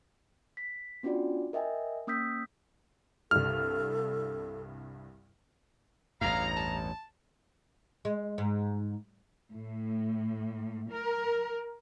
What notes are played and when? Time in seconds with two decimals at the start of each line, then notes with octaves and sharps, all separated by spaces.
0.57 B6
1.03 B3 C#4 D4 F4 F#4 D5
1.53 A#4 D#5 E5 G5 G#5
2.07 A#3 C#4 D#6 E6 G6 B6
3.31 C2 G2 A4 F6
6.21 A1 E2 G2 F5 A#5
6.57 A5
8.05 G#3
8.38 G#2
9.52 A2
10.90 A#4